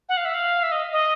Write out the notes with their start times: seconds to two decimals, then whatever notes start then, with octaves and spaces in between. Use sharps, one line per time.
0.09 F#5
0.17 F5
0.25 E5
0.34 F5
0.63 E5
0.72 D#5
0.93 D#5